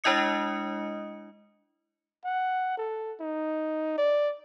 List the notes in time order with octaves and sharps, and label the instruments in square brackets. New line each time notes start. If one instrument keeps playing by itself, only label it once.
[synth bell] G#3 D4 E4 D#5 D#6 C#7
[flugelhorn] F#5
A4
D#4
D5